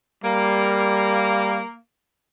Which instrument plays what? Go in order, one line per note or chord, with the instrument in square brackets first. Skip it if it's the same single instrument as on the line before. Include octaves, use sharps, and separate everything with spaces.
[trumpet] G3 [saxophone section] A#3